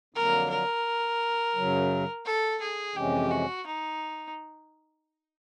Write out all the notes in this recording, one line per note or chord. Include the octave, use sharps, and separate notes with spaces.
F2 D3 F#3 A#3 A#4
A#4
F#2 C#3 F#3
A4
G#4
F2 C3 E3 G#3 C#4 G4
F#4
D#4